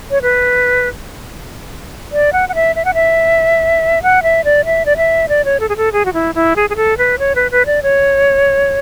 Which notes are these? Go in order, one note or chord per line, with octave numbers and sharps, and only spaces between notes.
C#5
B4
D5
F#5
F#5
E5
E5
F#5
E5
F#5
E5
D5
E5
D5
E5
D5
C#5
A4
G#4
A4
G#4
F#4
E4
E4
G#4
G#4
A4
B4
C#5
B4
B4
D5
C#5